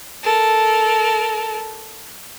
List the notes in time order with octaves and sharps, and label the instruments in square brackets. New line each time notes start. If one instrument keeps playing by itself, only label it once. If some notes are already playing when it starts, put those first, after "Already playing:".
[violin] A4 A#4